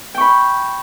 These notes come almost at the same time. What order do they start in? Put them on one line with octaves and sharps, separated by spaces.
G5 C#6 B5